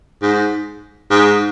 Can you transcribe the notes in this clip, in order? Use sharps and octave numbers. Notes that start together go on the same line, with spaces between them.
G#2
G#2